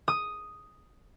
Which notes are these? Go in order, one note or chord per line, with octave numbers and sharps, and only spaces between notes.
D#6